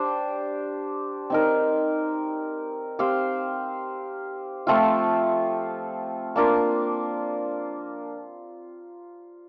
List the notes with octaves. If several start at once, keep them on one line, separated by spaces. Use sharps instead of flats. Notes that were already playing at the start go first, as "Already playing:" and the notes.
Already playing: D4 G4 C5
C4 D#4 A#4
C4 G4 C5 F5
F3 A3 C4 F4
A#3 D4 F4 A#4